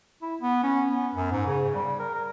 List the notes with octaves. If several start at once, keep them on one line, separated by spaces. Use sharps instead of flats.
E4
B3
C#4
B3
F#2
G#2
C#3
G3
A#4
A#4